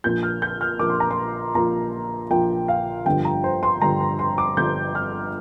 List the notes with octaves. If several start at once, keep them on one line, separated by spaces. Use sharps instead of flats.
A#1 A#2 A#3 F4 G6
F6
G6
F6
A#1 A#2 A#3 F4 D6
C6
A#5
C6
A#1 A#2 A#3 F4 A#5
A#1 A#2 A#3 F4 G5
F5
G1 G2 D3 F3 G5
A#5
C5
C6
G1 G2 D3 F3 A#5
C6
C6
D6
G1 G2 D3 F3 G6
F6